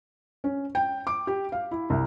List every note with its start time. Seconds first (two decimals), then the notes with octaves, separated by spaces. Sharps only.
0.44 C#4
0.75 G5
1.07 D6
1.27 G4
1.52 F5
1.71 E4
1.90 C2